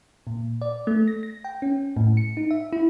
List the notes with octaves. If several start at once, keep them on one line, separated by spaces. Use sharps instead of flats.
A#2
D5
A3
A#6
A#6
G5
C#4
A2
C#7
D#4
E5
E4